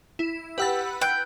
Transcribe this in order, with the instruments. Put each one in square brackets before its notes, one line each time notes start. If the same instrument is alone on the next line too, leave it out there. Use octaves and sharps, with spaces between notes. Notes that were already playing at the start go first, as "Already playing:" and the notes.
[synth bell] E4
[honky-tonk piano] G4 E6 A6 [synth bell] B4 F#5 B5
[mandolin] G5 [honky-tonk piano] F#6